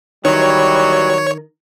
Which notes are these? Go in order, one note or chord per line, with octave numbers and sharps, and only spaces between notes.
B2 D#3 E3 F#3 G3 C#5